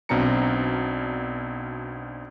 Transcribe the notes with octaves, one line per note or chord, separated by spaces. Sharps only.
B1 B2 C4 D4 A#5 C#7